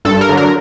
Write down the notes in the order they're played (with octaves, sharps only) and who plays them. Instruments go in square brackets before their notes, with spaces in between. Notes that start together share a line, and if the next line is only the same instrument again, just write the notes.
[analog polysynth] G2 A4
A#4
D3 F#3
A#4